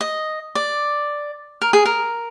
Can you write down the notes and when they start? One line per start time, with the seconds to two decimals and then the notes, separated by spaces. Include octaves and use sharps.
0.01 D#5
0.55 D5
1.62 A#4
1.73 G#4
1.85 A#4